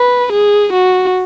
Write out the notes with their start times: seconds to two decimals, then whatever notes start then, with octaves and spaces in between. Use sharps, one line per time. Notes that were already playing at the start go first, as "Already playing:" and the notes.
Already playing: B4
0.33 G#4
0.73 F#4